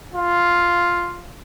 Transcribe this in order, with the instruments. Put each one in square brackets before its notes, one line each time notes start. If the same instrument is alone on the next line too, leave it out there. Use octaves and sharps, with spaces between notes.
[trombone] F4